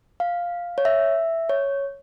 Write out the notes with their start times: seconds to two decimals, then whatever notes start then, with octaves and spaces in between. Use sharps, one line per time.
0.20 F5
0.78 C#5
0.85 E5
1.49 C#5